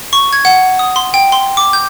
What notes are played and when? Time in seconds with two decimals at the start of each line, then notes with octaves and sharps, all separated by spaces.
0.13 C#6
0.33 G#6
0.45 F#5
0.79 D#6
0.96 C6
1.14 G5
1.32 C6
1.57 D6
1.73 G6